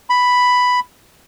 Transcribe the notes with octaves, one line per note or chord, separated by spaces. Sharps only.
B5